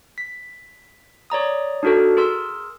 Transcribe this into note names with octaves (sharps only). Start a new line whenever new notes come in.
B6
C#5 D5 A#5 D#6
D4 D#4 F#4 A4 A#4
G#4 A#4 C6 E6